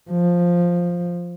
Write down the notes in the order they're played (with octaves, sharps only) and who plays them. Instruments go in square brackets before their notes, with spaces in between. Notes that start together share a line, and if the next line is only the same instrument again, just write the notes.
[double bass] F3